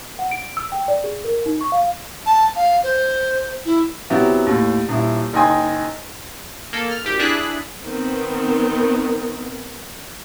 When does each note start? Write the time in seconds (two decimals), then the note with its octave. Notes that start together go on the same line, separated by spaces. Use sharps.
0.19 F#5
0.31 D7
0.57 E6
0.72 G5
0.88 D5
1.04 G#4
1.24 A#4
1.46 D#4
1.61 C#6
1.72 F5
2.26 A5
2.56 F5
2.84 C5
3.65 E4
4.10 C3 F#3 B3 E4 G4
4.46 D#2 A2
4.89 D#1 E4
5.33 F#1 D#4 D#5 G5 G#5 C6
6.73 A#3 A4
6.91 F6
7.05 G#1 G4
7.19 D4 E4 G#4 F#6 B6
7.83 D#3 B3 C4